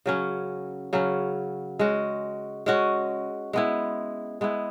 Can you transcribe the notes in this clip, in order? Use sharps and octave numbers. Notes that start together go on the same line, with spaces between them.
C#3 F#3 C#4
C#3 F#3 C#4
G#3 C#4 F#4
G#3 C#4 F#4
G#3 B3 E4
G#3 B3 E4